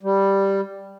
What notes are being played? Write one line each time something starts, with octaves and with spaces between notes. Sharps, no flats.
G3